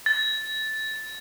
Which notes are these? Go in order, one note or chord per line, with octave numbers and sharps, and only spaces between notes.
A6